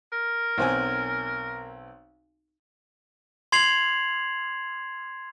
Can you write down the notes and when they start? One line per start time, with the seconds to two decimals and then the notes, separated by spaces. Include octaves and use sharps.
0.12 A#4
0.58 B1 C4 G#5
3.52 C6 G#6 C7 F7 F#7